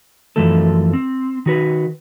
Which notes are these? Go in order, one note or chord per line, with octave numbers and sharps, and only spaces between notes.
F#2 B2 E3 F3 A3 A4
C4
D#3 F#4 B4